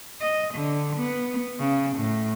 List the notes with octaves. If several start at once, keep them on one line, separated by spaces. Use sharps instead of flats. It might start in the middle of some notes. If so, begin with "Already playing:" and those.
D#5
D3
B3
C#3
A2